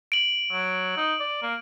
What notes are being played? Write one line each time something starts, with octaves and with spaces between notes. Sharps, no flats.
D7 F#7
F#3
D#4
D5
A#3